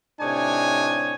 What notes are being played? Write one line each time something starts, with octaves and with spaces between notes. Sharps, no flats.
A2 C3 D4 D#4 C#5 G#5